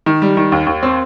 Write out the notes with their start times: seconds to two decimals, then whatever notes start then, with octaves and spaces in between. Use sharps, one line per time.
0.06 D#3
0.22 G3
0.37 D#3
0.52 D#2
0.67 D#2
0.83 C4